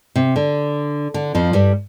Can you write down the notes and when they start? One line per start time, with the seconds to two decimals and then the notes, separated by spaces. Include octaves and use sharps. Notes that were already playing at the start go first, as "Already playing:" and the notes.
0.16 C3
0.36 D3
1.14 D3
1.35 F2 F3
1.53 G2 G3